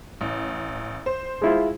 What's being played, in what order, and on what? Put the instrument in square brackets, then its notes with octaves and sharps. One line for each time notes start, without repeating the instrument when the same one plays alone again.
[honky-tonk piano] A1
C5
[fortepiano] G#3 E4 F4